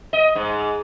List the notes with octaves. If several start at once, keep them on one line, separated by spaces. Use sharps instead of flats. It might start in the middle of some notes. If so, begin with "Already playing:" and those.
D#5
G#2